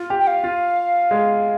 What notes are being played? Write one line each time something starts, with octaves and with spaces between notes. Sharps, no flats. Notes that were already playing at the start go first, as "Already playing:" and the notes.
Already playing: F4
G4
G5
F5
F4
G#3